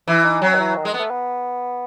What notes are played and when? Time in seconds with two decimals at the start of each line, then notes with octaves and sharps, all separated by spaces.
0.08 E3 E4
0.25 D#4
0.42 F#3 C#4
0.54 D#3
0.59 E3
0.76 D#3
0.85 G#3
0.94 B3
0.99 A3
1.10 B3